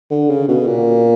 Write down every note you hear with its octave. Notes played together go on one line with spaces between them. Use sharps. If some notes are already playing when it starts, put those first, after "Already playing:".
D3
C#3
B2
A#2